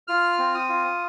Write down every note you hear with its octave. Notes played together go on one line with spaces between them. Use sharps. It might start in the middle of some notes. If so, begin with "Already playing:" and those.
F4 F6
C4
D#6
F4